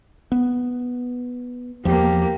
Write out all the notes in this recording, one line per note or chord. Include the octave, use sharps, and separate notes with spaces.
B3
E2 F3 A#3 G4